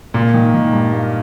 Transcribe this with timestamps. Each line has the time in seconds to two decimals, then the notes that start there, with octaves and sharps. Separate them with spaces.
0.14 A#2 A#3
0.34 D#3
0.54 D#3
0.73 G2
0.93 A#3